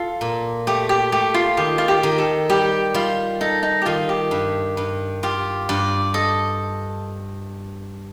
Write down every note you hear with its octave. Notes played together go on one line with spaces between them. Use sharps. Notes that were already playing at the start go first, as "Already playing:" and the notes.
Already playing: F4 A4
A#2
A3 G4
G4
A3 G4
F4
D#3 G4
F4
G4
D#3
A4
G3 G4
G3 F4
D#4 A4
D#4
G4
D#3 F4
G4
G2
G2
F4 G4
G2 D5
A4 D#5